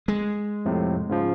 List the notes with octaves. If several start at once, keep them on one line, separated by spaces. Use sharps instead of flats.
G#3
F2 A2 C3
G#2 C#3 F3